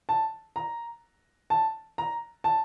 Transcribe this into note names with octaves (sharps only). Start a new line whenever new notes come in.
A5
A#5
A5
A#5
A5